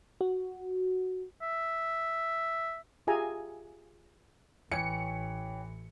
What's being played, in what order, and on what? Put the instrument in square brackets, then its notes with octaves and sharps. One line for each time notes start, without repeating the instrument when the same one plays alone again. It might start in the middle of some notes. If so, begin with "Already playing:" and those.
[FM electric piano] F#4
[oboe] E5
[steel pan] F4 G4 G#4 E5 G#5 A#5
[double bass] A1 [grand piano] E3 [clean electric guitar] C#5 G5 [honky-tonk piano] C#7